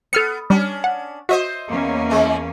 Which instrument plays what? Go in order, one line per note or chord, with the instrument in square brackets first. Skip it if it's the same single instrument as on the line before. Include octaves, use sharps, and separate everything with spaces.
[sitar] B3 [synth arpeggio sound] A4 F6 C#7
[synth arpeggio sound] G3 [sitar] C#4 D4
[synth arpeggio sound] F#5
[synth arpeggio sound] F#4 [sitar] C5 D#5 E5
[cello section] E2 A#3 C#4
[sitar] E3 G#3